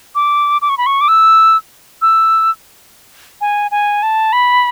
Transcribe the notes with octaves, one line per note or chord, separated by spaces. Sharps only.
D6
D6
C#6
B5
C#6
D6
E6
E6
G#5
G#5
A5
B5